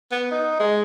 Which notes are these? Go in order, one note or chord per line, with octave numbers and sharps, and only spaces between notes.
B3
D#4
G#3